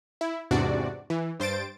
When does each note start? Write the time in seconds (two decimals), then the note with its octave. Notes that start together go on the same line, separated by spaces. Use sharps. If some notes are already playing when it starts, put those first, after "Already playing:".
0.21 E4
0.51 E2 G#2 C3 D4 F#4 D5
1.10 E3
1.40 G2 C5 A6 D7